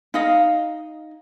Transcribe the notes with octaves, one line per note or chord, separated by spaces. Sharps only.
D#4 D#5 F5